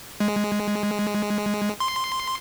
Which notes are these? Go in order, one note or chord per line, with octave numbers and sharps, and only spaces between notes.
G#3
C6